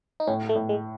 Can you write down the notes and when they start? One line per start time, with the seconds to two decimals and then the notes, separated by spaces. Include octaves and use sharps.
0.20 D#4
0.27 A2 C#4
0.49 A3
0.55 A2
0.69 G#3